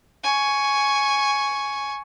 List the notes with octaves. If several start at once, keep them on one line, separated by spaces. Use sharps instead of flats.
G#5 C#6